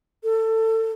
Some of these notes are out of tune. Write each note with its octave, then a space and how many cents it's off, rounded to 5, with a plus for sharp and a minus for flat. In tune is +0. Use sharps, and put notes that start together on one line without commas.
A4 +25